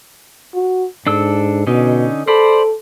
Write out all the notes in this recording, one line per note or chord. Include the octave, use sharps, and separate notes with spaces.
F#4
G#2 D4 A4 E6
B2 D3 C#4 D#4
A4 C5 D5 B5